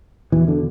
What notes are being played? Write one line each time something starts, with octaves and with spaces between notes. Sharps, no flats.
E2 B2 E3
D3